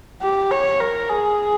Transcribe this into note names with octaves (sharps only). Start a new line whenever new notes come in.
G4
C#5
A#4
G#4